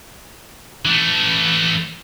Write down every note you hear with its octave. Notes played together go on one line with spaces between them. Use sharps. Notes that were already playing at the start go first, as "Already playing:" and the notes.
E3 A3